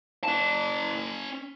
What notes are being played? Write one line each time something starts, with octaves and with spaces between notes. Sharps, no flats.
C#4 A5